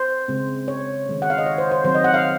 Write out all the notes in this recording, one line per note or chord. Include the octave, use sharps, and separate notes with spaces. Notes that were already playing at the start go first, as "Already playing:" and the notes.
Already playing: C5
C#3 G#3 C4
C#5
D#3 G#3 C#4
F#5
F5
D#5
C#5
C5
C5
D#3 F#3 C4 C5
D#5
F#5
F5